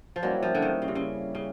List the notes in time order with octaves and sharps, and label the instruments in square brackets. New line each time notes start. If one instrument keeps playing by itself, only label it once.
[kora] F3
[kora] F#3 [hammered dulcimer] G3 A#3 C#4 E4
[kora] F3
D3
D#3
C#3
C3
C#3
C#3